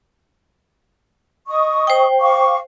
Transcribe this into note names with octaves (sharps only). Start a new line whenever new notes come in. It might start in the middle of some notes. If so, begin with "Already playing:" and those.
D#5 C#6 D#6
C5 G5
F5 C#6 D6